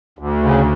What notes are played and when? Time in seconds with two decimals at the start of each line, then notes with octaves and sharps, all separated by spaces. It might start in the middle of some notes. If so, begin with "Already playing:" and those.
0.19 D2
0.42 C#3